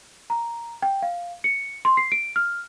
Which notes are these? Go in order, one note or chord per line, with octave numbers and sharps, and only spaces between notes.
A#5
G5
F5
C#7
C6
C7
D7
F6